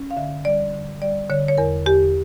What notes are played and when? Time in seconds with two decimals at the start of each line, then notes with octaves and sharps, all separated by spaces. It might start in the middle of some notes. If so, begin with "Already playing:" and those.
Already playing: C#4
0.11 F5
0.17 D3 E5
0.45 G3 D5
0.73 D3
1.01 G3 D5
1.30 D3 C#5
1.48 C#5
1.58 E2 A#4
1.86 E2 G4